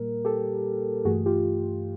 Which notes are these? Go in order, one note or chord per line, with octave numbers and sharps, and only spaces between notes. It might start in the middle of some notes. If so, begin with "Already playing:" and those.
Already playing: A#2 G3 A#3 A#4
G4 A4
G2 E3 A3 F#4 G#4
F4 G4